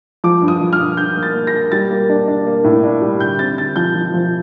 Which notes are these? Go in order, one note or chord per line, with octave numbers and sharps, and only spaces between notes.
F3 D6
G2
D#6
F3
F6
G2
G2 G6
A#3
A6
A#3
A#6
A#3
G3 A6
A#3
D4
D4
A#3
A2
D4
G3
D3 G6
C4 A6
D3 A6
F3 G6
F3
F3